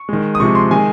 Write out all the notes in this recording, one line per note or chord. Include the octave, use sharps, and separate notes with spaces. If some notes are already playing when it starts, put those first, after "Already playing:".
Already playing: C#6
D#3 G#3
D#6
C3 F3 G#3 C#6
C6
D#3 G#3 G#5